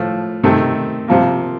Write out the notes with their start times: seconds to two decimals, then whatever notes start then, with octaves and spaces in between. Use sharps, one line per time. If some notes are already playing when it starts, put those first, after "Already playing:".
Already playing: A2 F3 A3
0.44 C3 D#3 A3
1.08 C3 F3 A#3